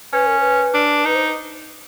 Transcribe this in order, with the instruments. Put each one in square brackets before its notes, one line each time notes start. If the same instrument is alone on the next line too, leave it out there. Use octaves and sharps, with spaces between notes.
[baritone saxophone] C#4 [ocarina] B4
[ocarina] A#4
B4
[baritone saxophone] D4
[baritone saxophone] D#4 [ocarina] B4
[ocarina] C5